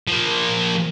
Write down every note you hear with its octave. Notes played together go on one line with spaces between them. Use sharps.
F3 A#3